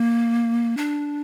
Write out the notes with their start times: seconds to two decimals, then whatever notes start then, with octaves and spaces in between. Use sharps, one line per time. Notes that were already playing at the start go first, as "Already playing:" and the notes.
Already playing: A#3
0.77 D4